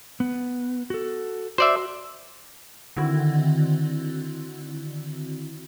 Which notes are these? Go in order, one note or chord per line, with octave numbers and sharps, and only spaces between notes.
B3
F#4 A4
F#4 C5 D5 E5
D3 D#3 C4 E4 F#4